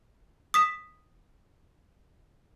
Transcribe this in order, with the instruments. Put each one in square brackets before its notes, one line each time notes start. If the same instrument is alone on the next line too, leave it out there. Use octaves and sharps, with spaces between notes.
[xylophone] D#6 B6 E7